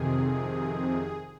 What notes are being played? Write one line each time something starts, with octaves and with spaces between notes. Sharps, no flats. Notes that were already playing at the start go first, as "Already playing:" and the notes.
Already playing: F2 C3 D#3 G#4